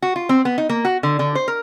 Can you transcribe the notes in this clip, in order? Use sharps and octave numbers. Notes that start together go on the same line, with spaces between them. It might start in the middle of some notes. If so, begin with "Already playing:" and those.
F#4
F4
C4
B3
D#4
A#3
F#4
D3
D3
C5
A#4